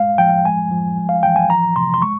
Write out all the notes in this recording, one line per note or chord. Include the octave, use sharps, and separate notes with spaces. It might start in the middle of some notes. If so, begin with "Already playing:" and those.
Already playing: G#3 F5
F3 G5
G#3 G#5
F3
G#3
F5
E3 G5
G#5
F3 A#5
C3 C6
C6
G#3 C#6